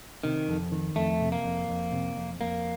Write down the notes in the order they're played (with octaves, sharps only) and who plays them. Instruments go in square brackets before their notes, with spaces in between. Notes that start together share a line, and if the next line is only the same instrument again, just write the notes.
[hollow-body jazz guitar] C3 [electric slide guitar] D#3
[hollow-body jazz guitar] F2
D#3
[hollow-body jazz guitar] F2 [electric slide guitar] A3
[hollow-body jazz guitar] C3
[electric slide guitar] A#3
[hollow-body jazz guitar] F2
F2
C3
F2
[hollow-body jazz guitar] F2 [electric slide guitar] A#3